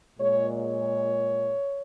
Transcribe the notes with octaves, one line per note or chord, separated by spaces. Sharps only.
A#2 G#3 C#5
C#5